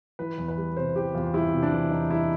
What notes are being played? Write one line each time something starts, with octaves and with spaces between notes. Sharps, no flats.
E3 B4
E2
B4
G3
C3 C5
E3 G4
E2 F4
G3 E4
C3
D4
E3
E2 D#4
G3 E4